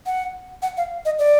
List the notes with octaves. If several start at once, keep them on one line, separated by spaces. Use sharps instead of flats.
F#5
F#5
F5
D#5
D5